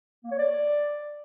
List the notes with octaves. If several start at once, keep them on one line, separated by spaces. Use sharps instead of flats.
A#3
C#5
D5